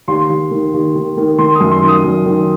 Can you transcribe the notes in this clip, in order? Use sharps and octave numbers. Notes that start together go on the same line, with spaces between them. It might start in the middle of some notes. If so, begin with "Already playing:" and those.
D#2 C6
D#2
D#3
D#2
D#3
D#3
D#3 C6
D#6
F#2
C6
D#3
D#6
F#2
D#3